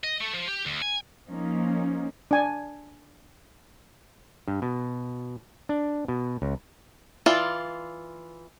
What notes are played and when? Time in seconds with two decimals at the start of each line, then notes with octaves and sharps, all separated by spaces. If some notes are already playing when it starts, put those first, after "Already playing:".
0.03 D#5
0.20 A3
0.33 F3
0.48 G4
0.66 D2
0.82 G#5
1.28 F3 A#3 C#4 D#4
2.31 D4 G#5
4.48 G2
4.62 B2
5.69 D4
6.08 B2
6.42 C#2
7.26 E3 F4 D5